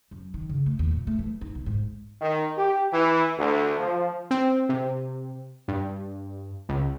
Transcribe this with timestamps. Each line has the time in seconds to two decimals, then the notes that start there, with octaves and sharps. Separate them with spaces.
0.11 F#2
0.34 D#3
0.49 C#3
0.66 A3
0.79 D#2
0.91 A#2
1.07 A3
1.19 E3
1.41 D#4
1.55 B1
1.66 G#2
2.21 D#3
2.56 G4
2.92 E3
3.38 D2
3.78 F3
4.31 C4
4.69 C3
5.68 G2
6.69 C#2